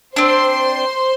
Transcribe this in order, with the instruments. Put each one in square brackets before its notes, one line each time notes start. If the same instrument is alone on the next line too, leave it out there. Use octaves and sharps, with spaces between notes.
[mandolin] C4 D4 [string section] C5 C6